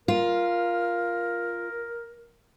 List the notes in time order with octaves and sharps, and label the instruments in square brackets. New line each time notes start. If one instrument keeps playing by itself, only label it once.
[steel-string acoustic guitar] F4 [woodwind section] A#4